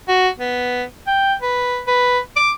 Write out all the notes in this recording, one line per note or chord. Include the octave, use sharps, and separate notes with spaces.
F#4
B3
G5
B4
B4
D6